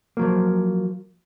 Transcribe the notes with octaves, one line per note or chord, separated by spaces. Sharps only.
F3 F#3 A#3